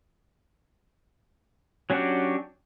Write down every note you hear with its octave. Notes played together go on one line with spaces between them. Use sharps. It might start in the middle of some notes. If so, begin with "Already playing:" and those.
F#3 C#4 D4 F#4 G4